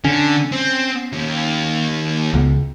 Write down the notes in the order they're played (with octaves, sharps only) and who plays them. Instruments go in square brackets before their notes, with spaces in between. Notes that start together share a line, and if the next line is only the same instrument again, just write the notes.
[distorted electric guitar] D3 [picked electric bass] C#4
[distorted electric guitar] C4
D#2
[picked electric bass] C#2